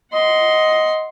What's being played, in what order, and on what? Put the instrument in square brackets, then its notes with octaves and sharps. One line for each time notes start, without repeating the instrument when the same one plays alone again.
[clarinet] D#5 [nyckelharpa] F#5 C6